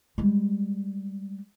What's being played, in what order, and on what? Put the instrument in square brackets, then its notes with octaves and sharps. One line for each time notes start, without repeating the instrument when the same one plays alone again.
[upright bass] G3 G#3